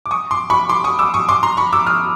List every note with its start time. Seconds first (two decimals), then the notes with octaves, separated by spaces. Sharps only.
0.06 D6
0.11 C#6 D#6
0.31 C6 D6
0.50 B5 C#6
0.69 C6 D6
0.84 C#6 D#6
0.99 D6 E6
1.14 C#6 D#6
1.29 C6 D6
1.43 A#5 C6
1.57 B5 C#6
1.73 D6 E6
1.87 D#6 F6